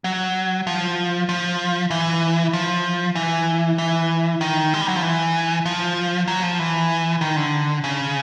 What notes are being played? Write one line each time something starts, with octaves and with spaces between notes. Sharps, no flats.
F#3
F3
F3
E3
F3
E3
E3
D#3
G#3
G3
F#3
F3
E3
F3
F#3
F3
E3
D#3
D3
C#3